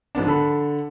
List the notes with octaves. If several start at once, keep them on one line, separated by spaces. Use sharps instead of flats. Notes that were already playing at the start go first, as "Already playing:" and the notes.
G#2 F3 B3 D4
D3 A4 B5